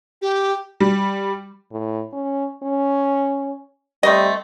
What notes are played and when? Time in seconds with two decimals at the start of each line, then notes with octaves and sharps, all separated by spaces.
0.22 G4
0.80 G3
1.72 A2
2.13 C#4
2.63 C#4
4.03 G3 A3 C4 D#5